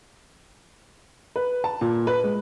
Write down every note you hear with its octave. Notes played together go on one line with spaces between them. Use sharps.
B4
A5
A#2
B4
G#3